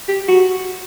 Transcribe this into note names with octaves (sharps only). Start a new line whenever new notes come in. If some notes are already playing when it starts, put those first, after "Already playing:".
G4
F#4